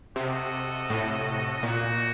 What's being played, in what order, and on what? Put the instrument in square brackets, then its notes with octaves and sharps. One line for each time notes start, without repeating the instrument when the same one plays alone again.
[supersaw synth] C3 [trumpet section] F#4 A4 D#5
[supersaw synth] A2
[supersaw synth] A#2 [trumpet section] A#3 D#4 F#4